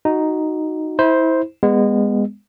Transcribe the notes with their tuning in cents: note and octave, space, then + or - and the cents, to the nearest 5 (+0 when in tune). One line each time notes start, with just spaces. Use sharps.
D#4 +0 F#4 +0
E4 -30 C5 +0
G#3 -25 B3 +0